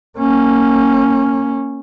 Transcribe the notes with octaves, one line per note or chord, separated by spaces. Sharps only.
A#3 C#4